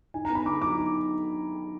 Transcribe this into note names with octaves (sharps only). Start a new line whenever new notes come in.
D#4 G#5
A#5
B3
B5
D3 D6
F#3 D6
D#4